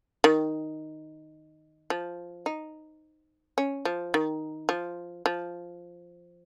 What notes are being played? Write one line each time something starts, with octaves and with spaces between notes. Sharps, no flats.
D#3
F3
D#4
C#4
F3
D#3
F3
F3